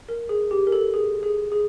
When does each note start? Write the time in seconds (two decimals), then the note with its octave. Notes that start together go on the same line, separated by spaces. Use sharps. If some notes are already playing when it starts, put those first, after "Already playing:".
0.09 A#4
0.29 G#4
0.51 G4
0.67 A#4
0.72 A4
0.94 G#4
1.23 G#4
1.52 G#4